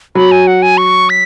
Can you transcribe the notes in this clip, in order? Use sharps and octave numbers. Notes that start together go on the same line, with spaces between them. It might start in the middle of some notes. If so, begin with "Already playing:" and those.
F#3 B5
G#5
F#5
G#5
C#6
B6